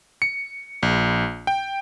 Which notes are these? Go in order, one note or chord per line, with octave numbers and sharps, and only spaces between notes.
C#7
A#1
G5